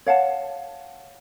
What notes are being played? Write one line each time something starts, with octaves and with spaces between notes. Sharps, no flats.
C#5 F5 F#5 A5